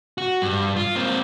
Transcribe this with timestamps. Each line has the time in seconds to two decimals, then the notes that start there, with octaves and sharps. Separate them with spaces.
0.18 F#4
0.42 G2
0.76 F4
0.95 A#3 C4